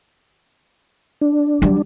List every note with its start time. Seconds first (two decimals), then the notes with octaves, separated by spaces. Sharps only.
1.21 D4
1.62 F#3 G3